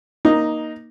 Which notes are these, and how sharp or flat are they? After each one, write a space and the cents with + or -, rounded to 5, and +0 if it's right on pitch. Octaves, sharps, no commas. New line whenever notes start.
A#3 +15 D#4 +0